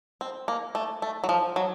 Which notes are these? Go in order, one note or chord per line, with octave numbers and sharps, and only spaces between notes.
C4
A#3
A3
A3
F#3
F3
F#3